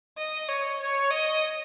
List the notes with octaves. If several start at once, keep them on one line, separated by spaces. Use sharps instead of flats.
D#5
C#5
C#5
D#5